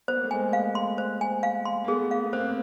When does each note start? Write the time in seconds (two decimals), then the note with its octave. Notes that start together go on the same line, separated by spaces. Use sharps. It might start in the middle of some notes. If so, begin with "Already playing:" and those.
0.08 B3 C5
0.16 A#3
0.24 A3
0.31 G#3 A#3 G#5
0.53 F5
0.75 C6
0.98 C5
1.21 G#5
1.43 F5
1.65 C6
1.84 A#3
1.88 A3 B3 G#4
2.11 F5
2.25 B3
2.33 A#3 C4 C5